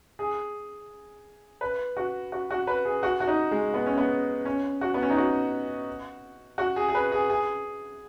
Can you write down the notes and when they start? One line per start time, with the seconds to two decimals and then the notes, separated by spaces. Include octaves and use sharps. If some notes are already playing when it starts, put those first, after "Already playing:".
0.19 G#4
1.61 B4
1.97 F#4
2.32 F#4
2.51 F#4
2.67 B4
2.85 G#4
3.03 F#4
3.20 F#4
3.27 D#4
3.51 G#3
3.74 B3
3.86 C#4
3.97 B3
4.45 C#4
4.81 F#4
4.94 B3
5.02 C#4
5.10 D#4
5.16 F#4
6.58 F#4
6.76 G#4
6.89 G#4
6.95 B4
7.12 G#4
7.30 G#4